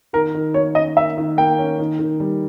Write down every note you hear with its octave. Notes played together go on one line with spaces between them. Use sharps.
D#3 A#4
D#3
A#3 C#5
C#4 D#5
A#3 E5
D#3
A#3 G5
C#4
D#3
D#3
G3